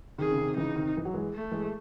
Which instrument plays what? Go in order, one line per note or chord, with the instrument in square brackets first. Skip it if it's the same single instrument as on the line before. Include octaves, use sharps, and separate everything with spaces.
[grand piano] C3 D#3 [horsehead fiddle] G#4
[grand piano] C#3
C3 D#3
[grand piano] C#3 E3 [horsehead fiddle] D#4
[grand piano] C3 D#3
E3
F#3
E3 G#3
[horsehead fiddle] A3
[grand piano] E3 G#3